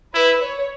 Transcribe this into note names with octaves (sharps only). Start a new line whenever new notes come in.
E4 B4
C#5